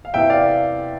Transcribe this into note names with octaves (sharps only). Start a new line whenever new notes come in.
F5
E2 C3 E3 E5 G5
D5 F5